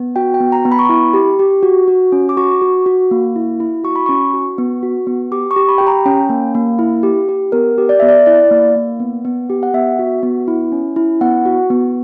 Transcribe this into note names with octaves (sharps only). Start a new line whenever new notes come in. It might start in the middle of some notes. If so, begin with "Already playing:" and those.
Already playing: B3
F#4 G5
G5
B3
A#5
B3
B5
C#6
E4 B5
G4
G4
F#4
F#4
C#4
D6
F#4 C#6
F#4
F#4
A#3
E4
E4
F#4 C#6
B5
C#4 C#6
F#4
B3
F#4
B3
G4 D6
C#6
G4
B5
G4 G5
A#5
C#4 G5
A#3
A#3
E4
G4
G4
B3 A#4
G4
D5
B3 E5
D5
E4 D5
A#3
A#3
B3
B3
G4
F#5
B3 E5
F#4
B3
E4
C#4
E4
B3 F#5
F#4
B3